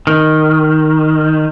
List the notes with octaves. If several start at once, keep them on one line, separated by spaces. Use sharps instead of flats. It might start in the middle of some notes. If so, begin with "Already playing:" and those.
D#3